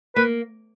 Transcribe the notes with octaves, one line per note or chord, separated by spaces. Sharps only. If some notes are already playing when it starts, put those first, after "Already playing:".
A#3 B4